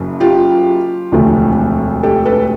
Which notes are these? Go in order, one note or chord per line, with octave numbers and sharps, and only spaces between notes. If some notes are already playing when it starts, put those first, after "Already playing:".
Already playing: F#1 F#2 C#3 F#3
F4 G4
E1 D2 C3 F3 A3
G4 A4
A4 B4